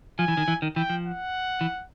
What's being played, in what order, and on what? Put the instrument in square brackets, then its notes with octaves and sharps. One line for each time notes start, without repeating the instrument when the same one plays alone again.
[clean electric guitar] F3 [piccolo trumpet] G#5
[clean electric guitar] E3
D#3
E3
D#3
[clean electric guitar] E3 [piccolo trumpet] G5
[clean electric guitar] F3
[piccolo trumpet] F#5
[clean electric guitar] E3